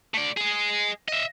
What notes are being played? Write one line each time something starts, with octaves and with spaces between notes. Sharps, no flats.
A3 D5
G#4 D#5
D#5 E5